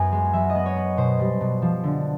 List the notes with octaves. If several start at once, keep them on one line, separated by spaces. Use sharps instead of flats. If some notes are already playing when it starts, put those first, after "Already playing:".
Already playing: F#2 B3 G#5
G#3
F#3 E5
D#5
B3
C#5
B3
B2 C5
G3
B2
F3
D3